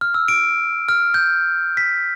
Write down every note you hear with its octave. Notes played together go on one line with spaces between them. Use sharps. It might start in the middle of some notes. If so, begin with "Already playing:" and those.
F6
E6
D7
F6
G6
B6